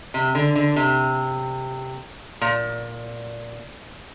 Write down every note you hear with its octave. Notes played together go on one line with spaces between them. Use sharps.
C3
D3
D3
C3
A#2